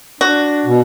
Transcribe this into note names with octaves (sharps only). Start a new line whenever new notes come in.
D4 F#4
B2